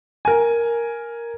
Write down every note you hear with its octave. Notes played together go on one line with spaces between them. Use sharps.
A#4 G#5